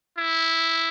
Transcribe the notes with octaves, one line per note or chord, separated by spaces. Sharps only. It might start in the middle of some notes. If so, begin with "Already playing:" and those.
E4